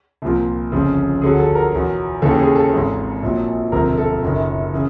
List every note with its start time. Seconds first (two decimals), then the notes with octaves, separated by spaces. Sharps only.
0.22 C2 A#2 F3
0.72 G1 F2 C#3 F3
1.22 D2 D3 F#3 G#4
1.40 A4
1.55 A#4
1.72 E2 B2 F#3
2.22 D#2 C#3 E3 A4
2.31 G4
2.40 G#4
2.55 A4
2.72 G#1 G#2 E3
3.23 A#1 A#2 F#3
3.72 E1 D2 C3 F3 A#4
3.97 A4
4.23 F#1 F#2 D#3
4.74 C#3 E3